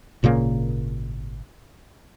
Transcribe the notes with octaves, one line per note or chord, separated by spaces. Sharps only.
G#1 A#2 C#3 A#3